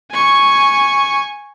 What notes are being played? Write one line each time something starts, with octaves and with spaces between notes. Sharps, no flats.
G#5 C#6